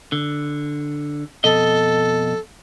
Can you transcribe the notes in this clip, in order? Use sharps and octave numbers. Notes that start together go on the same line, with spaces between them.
D3
F2 B2 A4 D#5